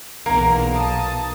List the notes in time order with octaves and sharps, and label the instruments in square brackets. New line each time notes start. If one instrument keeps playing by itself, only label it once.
[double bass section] B1 [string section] E2 A#4 [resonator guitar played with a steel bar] A#3 [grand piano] A#5
[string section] A5 D#6